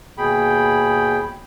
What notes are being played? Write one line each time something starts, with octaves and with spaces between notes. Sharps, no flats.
D#2 B2 G#4 G5 B5